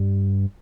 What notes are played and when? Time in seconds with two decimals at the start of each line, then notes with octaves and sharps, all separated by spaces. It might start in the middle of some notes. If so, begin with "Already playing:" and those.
Already playing: G2